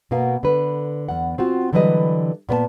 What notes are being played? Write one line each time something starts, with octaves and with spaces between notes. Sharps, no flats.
B2 A#3 B3 F#4 F5
D3 B4
E2 F#5
C4 F4 F#4
D3 E3 F#3 G3 B4 D#5
A#2 B3 C#5 A5